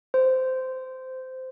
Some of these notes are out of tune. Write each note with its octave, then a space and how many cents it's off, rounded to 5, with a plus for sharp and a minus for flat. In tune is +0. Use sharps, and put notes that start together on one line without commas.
C5 -15